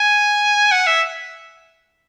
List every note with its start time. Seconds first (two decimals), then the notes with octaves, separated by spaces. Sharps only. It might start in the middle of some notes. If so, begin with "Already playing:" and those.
Already playing: G#5
0.72 F#5
0.87 E5